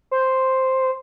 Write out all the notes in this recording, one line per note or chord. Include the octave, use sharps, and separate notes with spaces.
C5